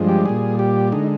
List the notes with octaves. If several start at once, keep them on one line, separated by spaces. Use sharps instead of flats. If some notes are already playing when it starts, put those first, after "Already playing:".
Already playing: G2 F3 G#3
G4
A#2 G3 G#4
G4
D3 G#3 D#4